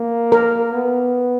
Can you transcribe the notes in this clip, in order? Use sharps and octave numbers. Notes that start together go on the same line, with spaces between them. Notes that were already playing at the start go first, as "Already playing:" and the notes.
Already playing: A#3
A#4
B3